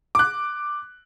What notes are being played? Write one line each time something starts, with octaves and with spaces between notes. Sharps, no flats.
D6 F#6